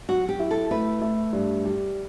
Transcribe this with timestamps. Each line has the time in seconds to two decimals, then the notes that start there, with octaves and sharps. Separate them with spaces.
0.09 F#3 F#4
0.29 G4
0.39 E4
0.51 A4
0.71 A3 B4
1.01 A3
1.33 G2
1.65 G3